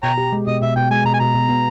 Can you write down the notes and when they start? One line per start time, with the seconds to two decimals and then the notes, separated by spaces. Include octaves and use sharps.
0.03 B2 C#5 G5 A#5
0.18 G4
0.33 G#3
0.47 B2 D#5
0.62 B2 E5
0.76 B2 G5
0.91 G#3 G#5
1.05 B2 A#5
1.14 G#5
1.19 B2 A#5
1.34 B2
1.49 B3